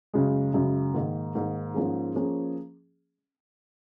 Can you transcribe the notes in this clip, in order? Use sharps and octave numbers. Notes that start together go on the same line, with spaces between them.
F#2 C#3 G#3
F#2 C#3 G#3
G#2 D#3 A#3 D#4
G#2 D#3 A#3 D#4
G#2 F3 A#3 C#4 G#4
F3 A#3 C#4 G#4